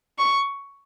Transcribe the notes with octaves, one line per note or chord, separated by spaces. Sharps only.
C#6